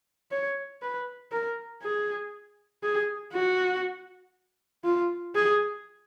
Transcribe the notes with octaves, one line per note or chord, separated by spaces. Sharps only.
C#5
B4
A#4
G#4
G#4
F#4
F4
G#4